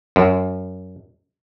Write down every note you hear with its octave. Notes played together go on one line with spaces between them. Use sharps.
F#2